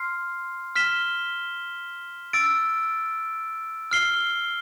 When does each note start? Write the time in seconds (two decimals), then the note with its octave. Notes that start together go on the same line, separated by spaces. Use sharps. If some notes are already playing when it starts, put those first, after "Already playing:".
Already playing: C6 F6 C7
0.75 F6 B6 E7 G7
2.33 E6 A6 D7
3.91 F6 C7 G7